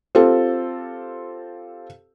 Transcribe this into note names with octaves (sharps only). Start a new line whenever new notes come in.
C4 F4 G4 A4